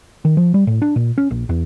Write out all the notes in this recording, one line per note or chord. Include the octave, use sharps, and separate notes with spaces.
D#3
F3
G3
A2
D4
A#2
C#4
A#1
E2